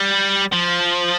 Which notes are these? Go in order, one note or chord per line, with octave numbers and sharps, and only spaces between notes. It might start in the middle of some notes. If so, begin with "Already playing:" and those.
Already playing: G3
F3